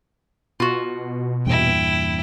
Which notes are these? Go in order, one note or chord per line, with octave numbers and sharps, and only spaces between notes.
B2 F4 F#4
E2 G2 A#2 E4 G5